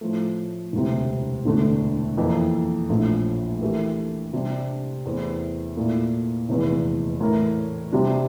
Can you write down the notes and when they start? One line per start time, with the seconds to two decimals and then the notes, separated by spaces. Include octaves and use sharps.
0.01 A2 F3 A3
0.73 E1 D2 C3
1.45 E1 D2 D3 A3
2.17 F2 E3 A#3
2.89 A#1 A2 F3 A3
3.61 E3 A3 E4 G4 A#4
4.33 C3 G3 D4
5.05 E2 E3 A3 C4
5.76 A#2 A3 E4
6.49 F1 E2 E3
7.21 A2 E3 A3 E4 A#4
7.92 C3 G3 D4